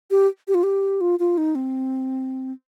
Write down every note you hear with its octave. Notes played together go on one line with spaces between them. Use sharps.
G4
G4
F4
G4
F4
F4
D#4
C4